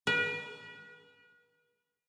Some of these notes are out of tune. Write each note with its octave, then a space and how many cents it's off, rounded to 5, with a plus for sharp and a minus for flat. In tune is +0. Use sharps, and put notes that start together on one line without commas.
B4 -40